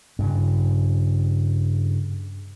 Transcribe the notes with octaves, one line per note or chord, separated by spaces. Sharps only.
G2 C#3